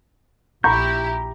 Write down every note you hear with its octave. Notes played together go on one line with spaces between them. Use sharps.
A#1 E4 G4 A#5 B5 C#6 G6